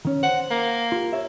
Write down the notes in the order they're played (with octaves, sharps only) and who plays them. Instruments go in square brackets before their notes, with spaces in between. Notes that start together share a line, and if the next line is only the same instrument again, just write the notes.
[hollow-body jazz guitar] D#3 C#4
[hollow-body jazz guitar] C5 [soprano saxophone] F#5
[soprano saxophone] A#3
[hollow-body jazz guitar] F4 G4
C#5 E5